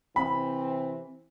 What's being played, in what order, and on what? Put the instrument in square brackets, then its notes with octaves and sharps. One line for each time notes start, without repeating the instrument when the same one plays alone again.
[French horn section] C3 E3 C4 [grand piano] B5